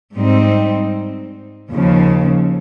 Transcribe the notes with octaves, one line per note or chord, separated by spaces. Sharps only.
G#2 G3 C4 D#4
D#2 C#3 F3